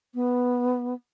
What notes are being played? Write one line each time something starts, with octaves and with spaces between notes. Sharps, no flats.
B3